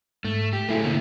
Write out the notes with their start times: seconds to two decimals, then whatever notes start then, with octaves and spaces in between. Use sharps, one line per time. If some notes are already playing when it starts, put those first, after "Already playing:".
0.25 G#2 A3
0.53 G4
0.69 A#2 F#3 A3 E4 G#4
0.84 B2 D3 A3 A#3 C4